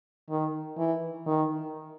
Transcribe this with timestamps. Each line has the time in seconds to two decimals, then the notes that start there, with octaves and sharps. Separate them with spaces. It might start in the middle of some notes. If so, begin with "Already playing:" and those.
0.29 D#3
0.78 E3
1.26 D#3